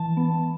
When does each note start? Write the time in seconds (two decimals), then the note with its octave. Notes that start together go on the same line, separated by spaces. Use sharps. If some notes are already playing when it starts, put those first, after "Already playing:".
Already playing: E3 A5
0.17 B3